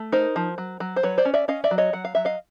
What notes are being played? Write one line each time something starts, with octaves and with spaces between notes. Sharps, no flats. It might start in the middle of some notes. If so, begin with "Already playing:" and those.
Already playing: A3
D#4 A#4 C5
F3
F#3
F#3
C5
F#3 B4 C#5
C5 D5
C#4
D5 E5
C#4 D#5 F5
D5 E5
F#3
C#5 D#5
F#3 F#5
F5
F#3 E5
D#5 F5